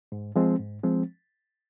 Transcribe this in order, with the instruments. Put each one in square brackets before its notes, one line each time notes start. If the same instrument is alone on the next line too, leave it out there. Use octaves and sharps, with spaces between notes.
[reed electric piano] G#2
F3 G#3 C4
G#2
F3 G#3 C4